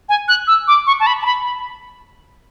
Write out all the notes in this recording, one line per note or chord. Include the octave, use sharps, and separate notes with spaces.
G#5
F#6
E6
D6
C#6
A5
B5
A5
B5
B5